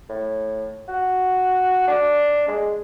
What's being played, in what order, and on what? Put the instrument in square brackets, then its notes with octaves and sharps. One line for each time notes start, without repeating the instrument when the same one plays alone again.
[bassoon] A2
F#4
D4
G#3